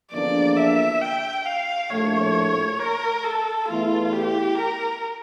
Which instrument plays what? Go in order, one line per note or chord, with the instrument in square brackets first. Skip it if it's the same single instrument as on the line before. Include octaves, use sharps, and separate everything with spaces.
[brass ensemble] E2 D3 F3 A#3 D4 [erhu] D5
[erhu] E5
G5
F5
[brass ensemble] A#1 A2 F3 A3 [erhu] C#5
[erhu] A#4
A4
[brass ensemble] E2 E3 A3 E4 [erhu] F4
[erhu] G4
A#4